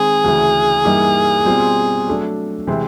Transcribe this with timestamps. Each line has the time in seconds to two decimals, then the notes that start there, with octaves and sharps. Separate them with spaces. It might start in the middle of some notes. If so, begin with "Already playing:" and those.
Already playing: D#3 G#3 C4 G#4
0.24 D2 C#3 E3
0.85 G2 E3 G3 A#3 D#4
1.46 B2 G3 C4 F4
2.06 F#3 A3 D4
2.67 C3 E3 G#3 C4